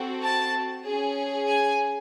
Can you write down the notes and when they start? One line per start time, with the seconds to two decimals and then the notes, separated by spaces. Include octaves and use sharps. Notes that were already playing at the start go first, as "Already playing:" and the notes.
Already playing: C4 F#4 A4
0.24 A5
0.86 C#4 G#4
1.48 G#5